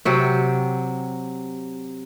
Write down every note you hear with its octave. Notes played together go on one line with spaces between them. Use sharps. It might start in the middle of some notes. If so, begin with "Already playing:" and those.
C3 F#3 G4